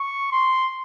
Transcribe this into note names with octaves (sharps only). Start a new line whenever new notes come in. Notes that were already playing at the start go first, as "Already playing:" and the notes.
Already playing: C#6
C6